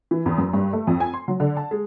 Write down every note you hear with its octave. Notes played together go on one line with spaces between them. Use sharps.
E3
E2
F#2
G2
A3
F2
G#5
C6
F#3
D3
A5
G#3